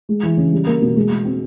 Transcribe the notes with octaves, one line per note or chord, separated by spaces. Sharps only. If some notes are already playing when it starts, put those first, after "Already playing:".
G#3
E3
C#3
G3
A#3
B2
G#3
G#3
C4